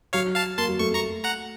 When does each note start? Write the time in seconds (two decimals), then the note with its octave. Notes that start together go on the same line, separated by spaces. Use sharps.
0.13 F#3 C#5 F5
0.35 F5 A5
0.58 A#3 A5 C6
0.68 F#3
0.79 A3 C#6
0.91 A3 A#5 C#6
1.24 F#5 A#5